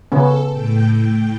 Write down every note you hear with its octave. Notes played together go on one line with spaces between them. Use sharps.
C#3 B3 C#4 A4
A2 G5